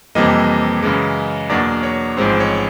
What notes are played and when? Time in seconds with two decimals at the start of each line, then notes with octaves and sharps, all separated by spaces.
0.15 F2 C3 E3 G3 A#3 D#5
0.82 F#2 C#3 E3 G#3
1.49 E2 B2 F#3 A#3 D4 D5
1.83 C#5
2.17 A1 G#2 F3 G#3 C4 C5
2.40 C#5